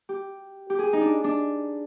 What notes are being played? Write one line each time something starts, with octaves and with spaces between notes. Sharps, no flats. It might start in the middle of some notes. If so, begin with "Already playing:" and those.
G4
G4
G#4
D#4
D4
D4